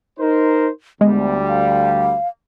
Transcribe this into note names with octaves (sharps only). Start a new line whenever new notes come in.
D#4 A#4 C5
D2 G3 G#3 B3
F5